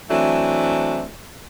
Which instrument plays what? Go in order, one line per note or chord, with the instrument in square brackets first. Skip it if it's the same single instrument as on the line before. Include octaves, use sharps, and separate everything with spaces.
[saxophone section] E3 F#3 A3 C4 D4